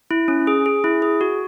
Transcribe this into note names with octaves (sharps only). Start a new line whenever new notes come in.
E4
C#4
G#4
G#4
E4
G#4
F#4